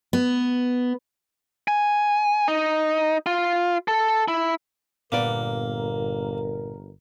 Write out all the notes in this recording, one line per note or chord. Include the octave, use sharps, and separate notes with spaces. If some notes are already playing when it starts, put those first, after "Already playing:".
B3
G#5
D#4
F4
A4
E4
G1 A#2 A#3 B3 A#4 D5